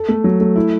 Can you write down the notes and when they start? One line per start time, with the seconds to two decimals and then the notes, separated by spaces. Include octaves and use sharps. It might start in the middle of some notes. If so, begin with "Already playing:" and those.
Already playing: A4
0.08 A3
0.24 F#3
0.40 A3
0.56 E4